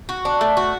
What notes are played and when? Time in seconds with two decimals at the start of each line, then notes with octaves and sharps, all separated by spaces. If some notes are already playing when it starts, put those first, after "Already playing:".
0.09 F#4
0.25 D4
0.41 A3
0.57 F#4